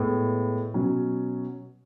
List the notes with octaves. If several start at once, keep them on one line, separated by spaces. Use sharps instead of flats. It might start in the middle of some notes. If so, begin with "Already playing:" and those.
Already playing: A2 G#3 B3
B2 F#3 C#4